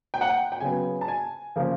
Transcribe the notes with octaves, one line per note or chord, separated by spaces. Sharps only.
G5
F#5
G5
G5
C#3 F#3 B3 G#5
A5
G#5
C#3 F3 A#3